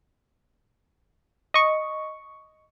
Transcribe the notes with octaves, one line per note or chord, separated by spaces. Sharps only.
D#5 C#6